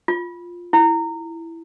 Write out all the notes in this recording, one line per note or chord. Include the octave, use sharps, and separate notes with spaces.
F4
E4